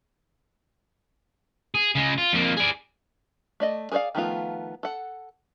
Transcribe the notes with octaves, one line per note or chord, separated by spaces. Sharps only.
G#4
C#3 G#3
F4
F2 A#3
G#4 D5
A3 D5 D#5
G#4 A#4 C5 D5 F5
D#3 F3 A3 B3 F4
A4 F#5